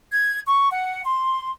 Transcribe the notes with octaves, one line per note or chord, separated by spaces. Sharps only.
G#6
C#6
F#5
C6